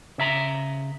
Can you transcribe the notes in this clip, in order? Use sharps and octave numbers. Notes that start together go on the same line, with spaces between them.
C#3 E5 A#5